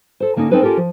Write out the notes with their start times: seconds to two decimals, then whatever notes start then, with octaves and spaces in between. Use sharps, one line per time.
0.20 A4 C5
0.36 D3 A#3 C#4 D#4
0.51 C4 C#4 D#4 A4 B4 C5
0.62 C#4 F4 G4 A4 A#4
0.77 F3